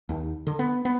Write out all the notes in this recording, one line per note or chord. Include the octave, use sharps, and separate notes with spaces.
D#2
D3
B3
B3